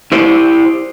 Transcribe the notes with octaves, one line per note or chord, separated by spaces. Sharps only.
E4 G4 C5